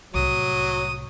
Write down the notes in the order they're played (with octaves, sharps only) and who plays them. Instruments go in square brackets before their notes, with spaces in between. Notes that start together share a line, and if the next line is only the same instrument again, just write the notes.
[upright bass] C2 A2 [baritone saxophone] F#3 [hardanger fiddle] D#6